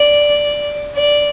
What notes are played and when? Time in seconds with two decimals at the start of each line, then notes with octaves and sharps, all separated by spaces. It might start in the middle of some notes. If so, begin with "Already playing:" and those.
Already playing: D5
0.96 D5